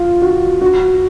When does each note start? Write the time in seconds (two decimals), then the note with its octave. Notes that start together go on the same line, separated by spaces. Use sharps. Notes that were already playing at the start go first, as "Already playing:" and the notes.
Already playing: F4
0.22 F#4
0.61 F#4